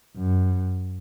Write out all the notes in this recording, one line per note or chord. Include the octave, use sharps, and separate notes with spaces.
F#2